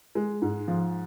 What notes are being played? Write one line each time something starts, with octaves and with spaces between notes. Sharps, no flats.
G#3
G#2
F3